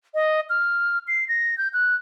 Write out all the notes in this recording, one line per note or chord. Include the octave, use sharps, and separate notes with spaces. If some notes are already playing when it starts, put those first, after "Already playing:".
D#5
F6
C7
A#6
G6
F#6